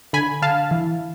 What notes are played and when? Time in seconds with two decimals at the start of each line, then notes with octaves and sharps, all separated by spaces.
0.13 D3 G#5 B5
0.42 D3 F5 A5
0.71 E3